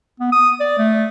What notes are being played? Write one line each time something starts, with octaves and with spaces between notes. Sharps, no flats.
B3
D#6
D5
A3